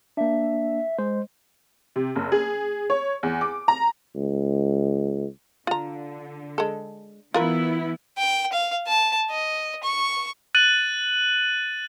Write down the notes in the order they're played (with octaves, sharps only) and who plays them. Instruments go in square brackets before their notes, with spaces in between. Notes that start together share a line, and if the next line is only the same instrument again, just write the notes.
[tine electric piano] A#3 D4 [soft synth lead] E5
[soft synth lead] G#3 [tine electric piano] C5
[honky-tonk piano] C3
F#1
G#4
C#5
E2
D6
A#5
[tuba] C#2
[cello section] D3 [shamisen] F4 A#5
[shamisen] G#3 A4
[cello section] E3 B3 E4 [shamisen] F4 A#4 B4
[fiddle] G5
F5
A5
D#5
C#6
[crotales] F#6 A6 D#7 F#7